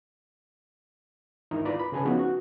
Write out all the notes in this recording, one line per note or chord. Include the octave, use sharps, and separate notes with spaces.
G#2 D#3 D#4 E4 A#4
F4 B4 D5 A#5 B5
B5
C#3 G#4 B4 G#5 A5
F3 B3 C#4 D#4 F#4
F#4